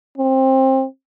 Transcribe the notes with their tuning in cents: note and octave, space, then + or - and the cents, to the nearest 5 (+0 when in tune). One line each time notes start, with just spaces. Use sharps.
C4 +20